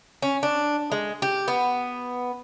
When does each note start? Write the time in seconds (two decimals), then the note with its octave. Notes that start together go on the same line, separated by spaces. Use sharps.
0.22 C#4
0.43 D4
0.92 G#3
1.22 G4
1.48 B3